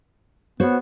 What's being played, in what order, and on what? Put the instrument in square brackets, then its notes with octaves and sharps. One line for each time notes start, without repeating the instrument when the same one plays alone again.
[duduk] B3 [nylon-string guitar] F#4 C5 C#5